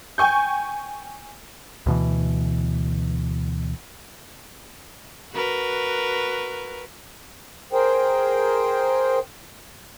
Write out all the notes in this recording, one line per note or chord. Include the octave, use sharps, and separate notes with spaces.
G5 G#5 C#6 G6
D2 B2 E3
F#4 A#4 B4
G#4 A#4 C5 G5